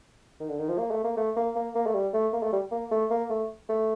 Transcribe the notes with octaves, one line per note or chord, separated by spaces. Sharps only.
D#3
D3
D#3
F3
A#3
A3
A#3
A3
A#3
A#3
A#3
A3
G3
A3
A#3
A3
G3
A#3
A3
A#3
A3
A3